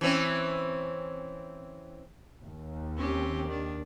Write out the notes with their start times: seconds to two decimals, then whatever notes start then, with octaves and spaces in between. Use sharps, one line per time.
0.01 E3 C4 C#4
2.43 D#2
2.97 C4 C#4 G4
3.48 D#3 D4